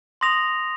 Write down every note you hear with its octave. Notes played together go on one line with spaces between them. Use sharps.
C6 D#6 A#6 F7